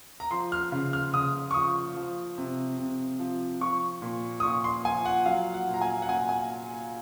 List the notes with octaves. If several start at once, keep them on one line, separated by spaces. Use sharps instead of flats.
A#5
F3 C6
F6
C#3
F6
C#3 D#6
C#6
F3 D#6
F3
C3
C3
F3
F3 C#6
A#2
D#6
A#2 C#6
C6
F3 G#5
F#5
F#3 F5
F#5
A#2
A#5
G#5
F#5
A#2 G#5
G#5